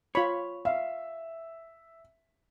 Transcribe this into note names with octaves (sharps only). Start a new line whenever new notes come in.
F4 C#5 B5
E5 F5